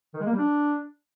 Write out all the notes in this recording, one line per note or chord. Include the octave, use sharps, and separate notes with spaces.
D#3
G#3
A#3
G3
D4